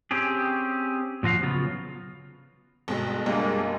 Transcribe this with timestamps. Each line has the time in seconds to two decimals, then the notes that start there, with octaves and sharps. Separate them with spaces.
0.11 C4 C#4 G4 G#4
1.23 A#2 F3 F#4 F5
1.42 C#3 F#3 B3 F4
2.88 G1 B2 G#3
3.26 F#1 G3 G#3 A#3 D4